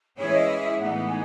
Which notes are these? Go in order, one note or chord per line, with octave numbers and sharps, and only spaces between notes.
E3 G#3 C#4 E4 G#4 C#5
D#5
E5
E5
A2 E3 G#3 B3 D#4 F#5
G#5